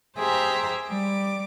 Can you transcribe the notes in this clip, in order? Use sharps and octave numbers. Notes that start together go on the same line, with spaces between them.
G4 G#4 C5 E5 A#5
G3 D6